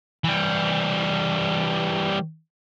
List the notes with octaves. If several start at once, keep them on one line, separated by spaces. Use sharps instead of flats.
E3 G3